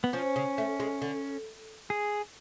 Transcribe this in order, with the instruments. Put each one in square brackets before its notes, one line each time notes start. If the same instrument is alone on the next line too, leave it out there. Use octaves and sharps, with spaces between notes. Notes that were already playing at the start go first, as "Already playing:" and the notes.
[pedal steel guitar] B3
[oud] F3 [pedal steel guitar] C#4
[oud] C#3
A3
G#3
D3
[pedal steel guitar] G#4